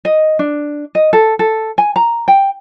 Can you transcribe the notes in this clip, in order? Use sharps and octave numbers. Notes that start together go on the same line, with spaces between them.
D#5
D4
D#5
A4
A4
G#5
A#5
G5